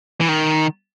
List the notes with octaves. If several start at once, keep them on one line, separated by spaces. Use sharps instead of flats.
E3
D#3